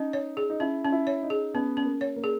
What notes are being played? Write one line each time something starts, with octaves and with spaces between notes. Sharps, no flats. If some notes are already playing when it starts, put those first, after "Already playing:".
Already playing: C#4 D#4
C#5
G#4
D#4
C#4 E4
C#4
E4
C#5
D#4
G#4
B3 C#4
C#4
A#3
C#5
A#3
G#4